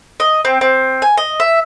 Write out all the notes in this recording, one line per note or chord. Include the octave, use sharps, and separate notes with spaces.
D#5
C4
C4
G#5
D#5
E5